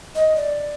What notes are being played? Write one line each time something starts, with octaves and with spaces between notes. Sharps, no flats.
D#5
D5